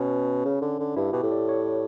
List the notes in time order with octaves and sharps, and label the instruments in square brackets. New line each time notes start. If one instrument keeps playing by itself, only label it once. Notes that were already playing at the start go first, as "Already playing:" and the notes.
Already playing: [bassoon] B2 [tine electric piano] C#4
[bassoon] C#3
D3
D3
[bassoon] G2 [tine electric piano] E4
[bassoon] B2 [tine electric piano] G4
[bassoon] A2
[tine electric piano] D5
C#5